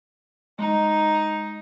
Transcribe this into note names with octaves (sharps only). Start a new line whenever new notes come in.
G#3 D#4